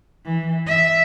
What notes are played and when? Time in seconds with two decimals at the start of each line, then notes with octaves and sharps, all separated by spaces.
0.25 E3
0.66 E5